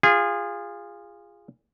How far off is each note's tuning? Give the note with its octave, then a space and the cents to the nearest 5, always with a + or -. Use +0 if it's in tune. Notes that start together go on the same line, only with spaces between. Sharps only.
F4 +0 G#4 -25